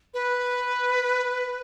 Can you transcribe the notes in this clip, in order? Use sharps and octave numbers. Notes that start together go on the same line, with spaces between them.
B4